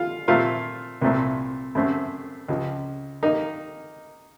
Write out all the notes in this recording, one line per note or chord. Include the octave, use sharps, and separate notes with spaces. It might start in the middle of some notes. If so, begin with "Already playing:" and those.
Already playing: F4
A#2 A3 C4 F4
C2 A#2 A3 C4
F#2 C#3 A3 C4
C#2 C#3 F3
D#3 A#3 D#4